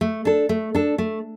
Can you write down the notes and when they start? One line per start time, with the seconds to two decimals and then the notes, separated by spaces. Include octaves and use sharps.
0.01 A3
0.25 D4 A4
0.49 A3
0.75 D4 A4
0.98 A3